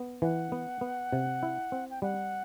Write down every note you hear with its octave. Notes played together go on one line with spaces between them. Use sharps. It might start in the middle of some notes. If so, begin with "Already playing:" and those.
Already playing: B3
E3 F#5
B3
B3
C3
E4
C4
G5
G3 F#5